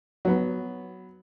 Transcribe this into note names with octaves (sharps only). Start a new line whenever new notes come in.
F#3 B3